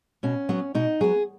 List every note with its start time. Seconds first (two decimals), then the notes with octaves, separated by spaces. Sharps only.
0.23 B2 C#4
0.49 F#3 B3
0.75 B2 D#4
1.01 F#3 B3 G#4